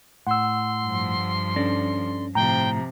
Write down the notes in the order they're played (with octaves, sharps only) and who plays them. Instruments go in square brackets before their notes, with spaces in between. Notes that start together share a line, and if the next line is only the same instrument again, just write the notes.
[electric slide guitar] A2 [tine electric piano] F#5 E6 [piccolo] C6
[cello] G2 F3
[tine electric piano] C#4 A#6 [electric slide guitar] D4 A4 D5
[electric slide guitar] A2 [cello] C3 F3 [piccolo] G5 [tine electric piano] A#5